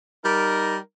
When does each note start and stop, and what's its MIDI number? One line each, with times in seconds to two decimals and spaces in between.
0.24 0.78 55
0.24 0.78 63
0.24 0.78 70